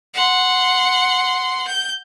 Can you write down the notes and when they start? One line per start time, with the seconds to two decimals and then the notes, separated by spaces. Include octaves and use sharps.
0.14 F#5 C6
1.68 G6